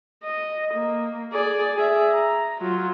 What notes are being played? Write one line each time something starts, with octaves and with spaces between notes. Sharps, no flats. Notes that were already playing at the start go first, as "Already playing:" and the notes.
D#5
A#3
G#4 D5
G#4 E5
A#5
F#3 F4